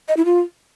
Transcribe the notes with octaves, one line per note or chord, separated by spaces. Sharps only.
D#5
E4
F4